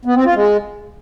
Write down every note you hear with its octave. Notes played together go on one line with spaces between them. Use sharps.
B3
C4
F4
G#3